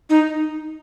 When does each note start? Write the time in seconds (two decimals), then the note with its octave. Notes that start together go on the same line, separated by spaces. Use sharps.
0.10 D#4